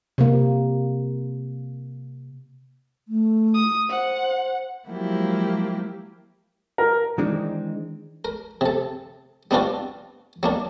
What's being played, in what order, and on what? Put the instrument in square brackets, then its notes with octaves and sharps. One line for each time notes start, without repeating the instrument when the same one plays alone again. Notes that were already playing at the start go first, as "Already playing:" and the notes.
[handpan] C3 A#3
[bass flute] A3
[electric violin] D#6
[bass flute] C5 [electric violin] F#5
[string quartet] F3 F#3 G#3 A#3 E4 G4
[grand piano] A#4
[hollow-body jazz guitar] D#3 E3 G#3 C4 D4 D#4
[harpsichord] A#4
C3 A4
G3 B3 C4 D4 F4 F#4
F#3 A#3 D4